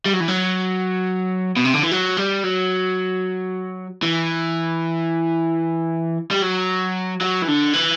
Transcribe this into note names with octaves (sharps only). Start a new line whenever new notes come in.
G3
F#3
E3
F#3
B2
C3
D3
E3
F#3
G3
F#3
E3
G3
F#3
F#3
E3
D3
E3